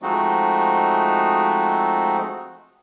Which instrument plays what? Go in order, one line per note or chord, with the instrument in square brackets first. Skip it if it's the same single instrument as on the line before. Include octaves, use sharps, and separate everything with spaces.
[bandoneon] F3 G#3 A3 C4 D#4 F#4